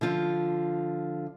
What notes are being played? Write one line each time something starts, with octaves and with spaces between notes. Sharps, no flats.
D3 F3 F4